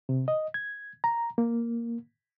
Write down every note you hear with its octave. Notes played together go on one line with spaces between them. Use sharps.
C3
D#5
G#6
A#5
A#3